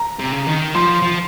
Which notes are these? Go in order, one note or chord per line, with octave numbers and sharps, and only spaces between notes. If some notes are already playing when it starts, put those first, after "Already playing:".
Already playing: A#5
C3
C#3
D#3
F3 C6
F3